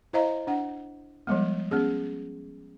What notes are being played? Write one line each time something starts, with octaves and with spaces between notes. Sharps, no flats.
E4 C5 D#5 F5 A#5
D4 F#5
F3 G3 G#3 B3
B3 C#4 G#4